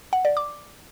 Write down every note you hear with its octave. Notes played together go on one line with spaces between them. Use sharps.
F#5
D5
D6